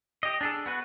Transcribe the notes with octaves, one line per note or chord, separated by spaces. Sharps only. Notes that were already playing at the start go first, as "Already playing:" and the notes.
G4 D#5
D4 G#4 A4
B3 F#4 B4